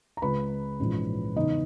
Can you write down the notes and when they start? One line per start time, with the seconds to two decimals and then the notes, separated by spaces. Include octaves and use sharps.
0.17 A#5
0.22 C#2 C#3 G#3 B4 B5
0.80 A#1 G#2 E3 G#3 C#4
1.36 E2 C#3 E3 D#4 D#5